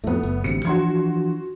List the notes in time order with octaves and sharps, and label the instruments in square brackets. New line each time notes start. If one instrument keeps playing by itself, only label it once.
[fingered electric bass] F2 A2 [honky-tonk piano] A3 B3
[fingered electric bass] F#1
[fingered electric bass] A1 D2 C3 [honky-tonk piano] C#7
[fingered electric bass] E3 F3 D4 [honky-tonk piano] F#4 C6 G#6